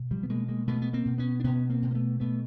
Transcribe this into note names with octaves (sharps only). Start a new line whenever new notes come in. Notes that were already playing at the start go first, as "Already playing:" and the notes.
Already playing: B2
F3 G3
B3
B2 G#3 A#3
G#3 A#3
B2 A3 B3
B3
A#3 C4
B2
B3 C#4
D4
B2 B3 C#4
A#3 C4
B2
A#3
A3 B3
B2 A3 B3